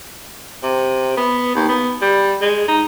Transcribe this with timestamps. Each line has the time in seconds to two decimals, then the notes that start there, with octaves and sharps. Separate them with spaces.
0.63 C3
1.17 B3
1.55 D#2
1.69 B3
2.02 G3
2.41 G#3
2.68 D#4